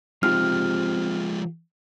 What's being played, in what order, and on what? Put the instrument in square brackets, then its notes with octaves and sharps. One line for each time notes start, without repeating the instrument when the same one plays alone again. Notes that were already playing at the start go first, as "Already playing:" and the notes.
[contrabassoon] C3 [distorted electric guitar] F3 G#3 [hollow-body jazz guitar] D#4 F4 G4 [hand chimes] F6